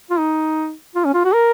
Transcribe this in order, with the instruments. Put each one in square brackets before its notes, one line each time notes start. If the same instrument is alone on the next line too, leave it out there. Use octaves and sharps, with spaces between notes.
[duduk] F4
D#4
F4
C#4
F4
F#4
A#4